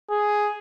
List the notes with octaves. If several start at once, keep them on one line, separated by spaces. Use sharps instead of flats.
G#4